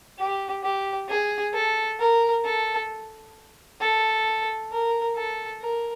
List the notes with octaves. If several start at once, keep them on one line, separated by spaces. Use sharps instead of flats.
G4
G4
G#4
A4
A#4
A4
A4
A#4
A4
A#4